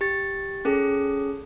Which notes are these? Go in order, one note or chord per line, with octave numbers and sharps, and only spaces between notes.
G4 A6
C#4 G#4 A4